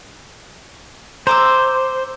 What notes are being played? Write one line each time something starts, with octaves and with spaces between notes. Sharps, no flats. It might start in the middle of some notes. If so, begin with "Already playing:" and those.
C5 A#5 D6 E6